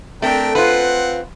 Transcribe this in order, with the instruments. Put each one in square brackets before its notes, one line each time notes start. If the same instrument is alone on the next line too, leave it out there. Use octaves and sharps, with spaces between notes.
[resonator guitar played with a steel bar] A3 C4 [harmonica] D4 A#4 G5
[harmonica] C4 F#5 [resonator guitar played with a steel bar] F4 B4